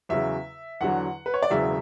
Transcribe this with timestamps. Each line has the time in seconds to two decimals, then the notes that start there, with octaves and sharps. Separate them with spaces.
0.09 E2 C#3 F#3 E5
0.81 E2 D3 F#3 F#5
1.26 B4
1.34 C#5
1.42 D5
1.50 E1 E2 C#3 F#3 E5